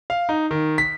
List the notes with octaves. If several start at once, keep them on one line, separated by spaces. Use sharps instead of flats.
F5
D#4
D#3
B6